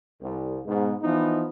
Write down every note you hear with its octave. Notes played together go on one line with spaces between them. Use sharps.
C2
G#2 B2
E3 F3 B3 D#4